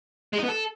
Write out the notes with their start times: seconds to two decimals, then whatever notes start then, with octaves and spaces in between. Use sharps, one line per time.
0.33 G#3
0.39 D#4
0.44 B3
0.49 A4